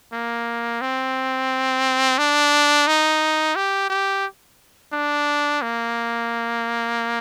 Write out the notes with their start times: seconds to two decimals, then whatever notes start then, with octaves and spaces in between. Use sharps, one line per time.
0.13 A#3
0.81 C4
2.18 D4
2.87 D#4
3.56 G4
3.90 G4
4.93 D4
5.62 A#3